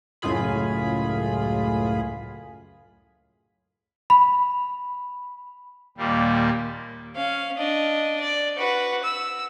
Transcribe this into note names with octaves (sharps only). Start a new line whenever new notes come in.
C#2 F#2 A2 F4 G#4 B5
B5
D#2 A#2 G3 A#3
C#4 F5
D4 D#5
D5
F#4 B4
E6